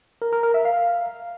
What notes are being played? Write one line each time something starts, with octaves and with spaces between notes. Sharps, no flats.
A#4
A#4
A#4
E5
F5